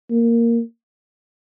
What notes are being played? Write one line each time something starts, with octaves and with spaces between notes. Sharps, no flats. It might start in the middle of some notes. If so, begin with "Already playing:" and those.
A#3